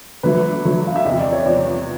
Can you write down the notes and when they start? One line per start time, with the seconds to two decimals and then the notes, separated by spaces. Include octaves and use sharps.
0.23 D3 F#3 A3 B4
0.65 D3 F#3 A3
0.87 F5
0.96 E5
1.05 E2 C3 F3 D#5
1.19 D5
1.33 C#5
1.46 E2 C3 F3 D5